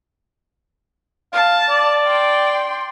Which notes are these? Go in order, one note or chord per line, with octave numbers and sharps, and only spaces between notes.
F5 A5
D5
G5 C6